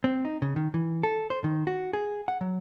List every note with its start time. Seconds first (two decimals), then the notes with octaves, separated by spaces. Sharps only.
0.04 C4
0.25 D#4
0.42 C#3
0.56 D#3
0.74 E3
1.03 A4
1.30 C5
1.44 D#3
1.67 F#4
1.93 G#4
2.28 F#5
2.41 F#3